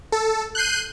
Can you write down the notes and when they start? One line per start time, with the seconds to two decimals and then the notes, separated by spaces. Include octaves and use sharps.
0.12 A4
0.55 F#6 G6 C7 D#7